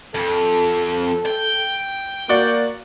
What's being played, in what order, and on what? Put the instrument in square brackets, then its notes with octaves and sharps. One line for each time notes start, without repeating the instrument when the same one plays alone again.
[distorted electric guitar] F2 [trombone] A4
[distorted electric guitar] G5
[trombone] A#3 [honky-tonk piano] F#4 D5